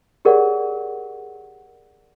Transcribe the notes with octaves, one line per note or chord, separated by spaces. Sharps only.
G4 G#4 A#4 C#5 D5 F#5